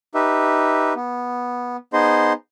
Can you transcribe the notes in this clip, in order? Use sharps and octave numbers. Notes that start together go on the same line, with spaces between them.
D#4 G4 B4 E5
B3
B3 D#4 G#4 C5 D#5 C6